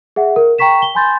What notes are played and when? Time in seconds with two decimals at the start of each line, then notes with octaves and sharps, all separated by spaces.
0.16 G#4 E5 F#5
0.36 A#4
0.58 G5 A#5 C#6 B6 E7
0.82 G7
0.95 G#5 B5 C6 G6 A6